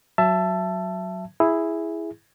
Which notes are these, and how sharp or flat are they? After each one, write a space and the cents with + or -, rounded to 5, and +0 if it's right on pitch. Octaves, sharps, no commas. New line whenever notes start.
F#3 +0 E5 +20 A5 +0
E4 +0 G#4 +0